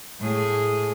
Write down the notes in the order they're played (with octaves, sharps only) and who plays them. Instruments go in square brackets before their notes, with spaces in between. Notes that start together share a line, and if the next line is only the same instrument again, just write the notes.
[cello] A2 G#4